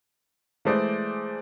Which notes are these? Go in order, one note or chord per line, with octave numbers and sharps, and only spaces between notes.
E3 G#3 A3 C5 D5